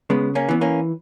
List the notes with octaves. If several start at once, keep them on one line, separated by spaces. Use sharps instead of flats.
C#3 G#3 B3
A#3 C#4
E3 B3
A#3 C#4